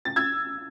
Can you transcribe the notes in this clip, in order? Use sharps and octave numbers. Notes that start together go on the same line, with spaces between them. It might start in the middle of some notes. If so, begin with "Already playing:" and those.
A6
E6 G#6